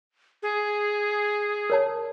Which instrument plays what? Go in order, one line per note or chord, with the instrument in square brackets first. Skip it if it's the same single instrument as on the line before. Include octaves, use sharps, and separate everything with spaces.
[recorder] G#4
[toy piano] A#4 C#5 A5